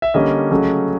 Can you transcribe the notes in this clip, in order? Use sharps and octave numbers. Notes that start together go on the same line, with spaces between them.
E5
D3 G3 A#3 C#4 D#5
C#3 F#3 A3 C#4